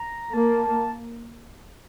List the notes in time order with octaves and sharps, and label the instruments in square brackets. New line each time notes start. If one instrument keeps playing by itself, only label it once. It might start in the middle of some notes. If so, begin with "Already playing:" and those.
Already playing: [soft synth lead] A#5
[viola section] A#3 [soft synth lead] A5